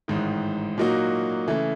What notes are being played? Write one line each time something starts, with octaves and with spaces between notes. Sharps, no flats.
A1 G#2 D#3
A#2 F#3 A#3 D#4 F#4
C#3 E3 A3